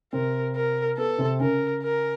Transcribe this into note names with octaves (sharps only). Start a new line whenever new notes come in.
C3 C4 A#4
A#4
B3 A4
C3 C4
C#3 C#4 A#4
A#4